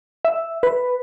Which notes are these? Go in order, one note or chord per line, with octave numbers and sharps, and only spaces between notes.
E5
B4